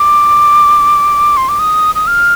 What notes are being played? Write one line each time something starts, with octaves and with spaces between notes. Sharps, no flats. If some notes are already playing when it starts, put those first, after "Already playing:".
Already playing: D6
C6
D6
D#6
D#6
F6